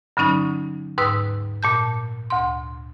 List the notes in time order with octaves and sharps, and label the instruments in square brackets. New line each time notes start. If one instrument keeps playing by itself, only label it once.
[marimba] G2 D3 F#3 C#4 D#4
D#2 G#2 B4 D#6 E6
A#2 A5 G6
D2 C6